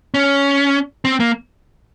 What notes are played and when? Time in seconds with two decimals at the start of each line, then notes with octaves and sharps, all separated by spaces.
0.14 C#4
1.05 C4
1.20 A#3